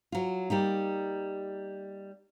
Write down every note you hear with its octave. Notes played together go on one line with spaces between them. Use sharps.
F#3 F4
G3 A#3 D#4